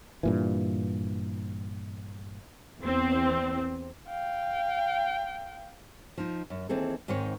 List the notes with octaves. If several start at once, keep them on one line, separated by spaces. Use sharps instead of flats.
G2 A#2 E3
E2 C4
F5 G5
F3 D#4
F#2
D#2 E3 C4 G#4 A4
G#2 D#3 C4 D#4 C#5